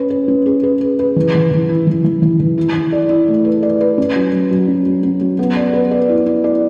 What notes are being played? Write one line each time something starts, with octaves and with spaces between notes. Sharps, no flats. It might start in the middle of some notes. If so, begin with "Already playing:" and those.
Already playing: C#4 B4
B4
C#4
G#4
B4
B4
B4
E3
E3
E3
E4
E3
E3
E3
E3
E4
E4
D5
E4
A3
B4
D5
B4
C#4
F#3
F#3
F#3
C#4
F#3
C#4
F#3
B3
D5
B4
D5
E4
E4
D5